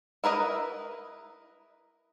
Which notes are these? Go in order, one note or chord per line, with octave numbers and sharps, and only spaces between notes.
E4 A#4 B4 D#5